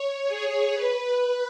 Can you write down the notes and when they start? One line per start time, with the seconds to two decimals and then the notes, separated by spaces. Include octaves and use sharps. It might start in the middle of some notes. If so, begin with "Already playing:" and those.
Already playing: C#5
0.27 G#4
0.73 B4